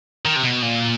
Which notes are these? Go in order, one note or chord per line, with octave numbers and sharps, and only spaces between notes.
D#3
C3
B2
A#2